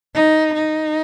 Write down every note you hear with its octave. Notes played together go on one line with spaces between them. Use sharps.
D#4
D#4